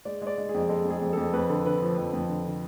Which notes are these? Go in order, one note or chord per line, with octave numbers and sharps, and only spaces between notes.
G#3 D5
G#3 D5
G#3
G#4
F2
G#3 A4
F2
G#4
F2
F2 A4
F2 B4
D3 A4
D3 B4
F3
F2
F2
D3
D3